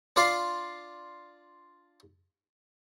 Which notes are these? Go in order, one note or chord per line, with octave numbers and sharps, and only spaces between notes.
D4 F4 D5 F5 C6